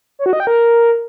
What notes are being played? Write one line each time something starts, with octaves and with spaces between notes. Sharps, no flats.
C#5
F#4
D#5
G5
A#4